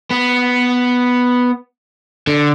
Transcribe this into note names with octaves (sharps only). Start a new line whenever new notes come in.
B3
D3